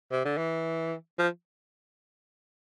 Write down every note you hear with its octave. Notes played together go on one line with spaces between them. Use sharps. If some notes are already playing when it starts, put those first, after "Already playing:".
C3
D3
E3
F3